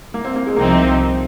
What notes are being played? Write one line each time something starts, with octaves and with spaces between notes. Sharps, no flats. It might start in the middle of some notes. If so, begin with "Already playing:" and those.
A#3
C4
A#3
G#3
C2 C3 F3 A#3 C4 D#4